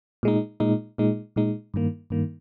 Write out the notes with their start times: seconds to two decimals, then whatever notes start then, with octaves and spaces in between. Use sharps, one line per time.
0.23 A#2 G#3 D#4
0.60 A#2 G#3 D#4
0.98 A#2 G#3 D#4
1.36 A#2 G#3 D#4
1.74 G2 D#3 A#3
2.10 G2 D#3 A#3